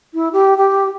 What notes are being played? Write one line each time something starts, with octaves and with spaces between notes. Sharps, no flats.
E4
G4
G4